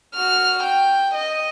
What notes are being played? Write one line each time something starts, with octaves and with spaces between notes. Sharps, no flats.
F#4 F6
G5
D#5